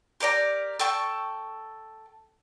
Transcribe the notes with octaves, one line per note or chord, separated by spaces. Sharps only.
G4 A#4 D5 A#5
A4 G5 C#6